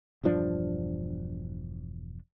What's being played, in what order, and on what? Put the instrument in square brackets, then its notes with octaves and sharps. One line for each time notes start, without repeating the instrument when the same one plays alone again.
[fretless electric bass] E1 G2 F3 D4